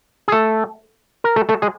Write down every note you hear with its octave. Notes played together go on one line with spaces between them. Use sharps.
G#4
A3 A4
A#4
A3 A4
A3 A4
G#3 G#4